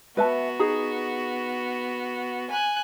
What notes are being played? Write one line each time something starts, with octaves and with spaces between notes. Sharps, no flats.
B3 F#4 B4 E5 A5
D#4 G#4 A#5
G#5 F#6